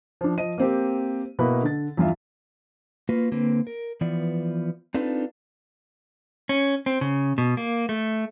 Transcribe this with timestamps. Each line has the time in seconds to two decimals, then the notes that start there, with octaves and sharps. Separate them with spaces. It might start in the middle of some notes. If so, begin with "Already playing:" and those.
0.21 F3 D4
0.38 F3 D#5 D#7
0.58 A#3 C4 G4
1.39 B2 A#3 E4 B4
1.63 D3 A6
1.97 E2 G2 F4 E5
3.09 A#3 F4 F#4 B4
3.32 D3 A#3 C4 B4
3.67 A#4
4.01 E3 F3 B3 D5
4.94 C4 D4 D#4 F4 A4 B4
6.49 C#4
6.86 C4
7.01 C#3
7.38 B2
7.57 A#3
7.89 A3